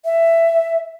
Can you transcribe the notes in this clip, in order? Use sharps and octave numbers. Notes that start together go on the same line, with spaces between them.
E5